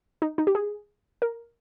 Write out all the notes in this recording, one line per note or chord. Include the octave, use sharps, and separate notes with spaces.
D#4
D#4
G4
G#4
A#4